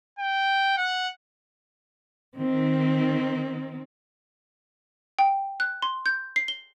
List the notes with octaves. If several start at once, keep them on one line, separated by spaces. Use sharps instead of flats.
G5
F#5
D#3 C4
G5
F#6
C6
G6
C7
G7